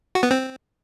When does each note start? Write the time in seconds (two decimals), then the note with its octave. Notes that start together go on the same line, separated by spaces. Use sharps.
0.15 F#4
0.23 B3
0.31 C4